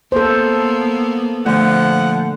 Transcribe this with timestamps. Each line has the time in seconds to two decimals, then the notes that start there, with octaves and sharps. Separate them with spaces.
0.12 A#3 B3 A4 C5
1.46 A#2 D3 F3 A3 F#5